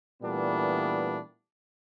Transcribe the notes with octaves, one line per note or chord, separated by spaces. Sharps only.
A#2 E3 G3 A3 B3 D4